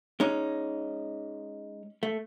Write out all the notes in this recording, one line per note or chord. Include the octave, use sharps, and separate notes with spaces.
G#3 C#4 D#4
A3